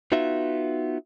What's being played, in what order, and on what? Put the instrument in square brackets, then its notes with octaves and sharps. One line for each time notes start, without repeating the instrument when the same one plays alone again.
[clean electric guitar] B3 D#4 F4 F#4 E5